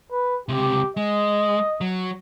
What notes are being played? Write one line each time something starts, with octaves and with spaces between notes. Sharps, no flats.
B4
C#2 C3 G4
G#3 D#5
F#3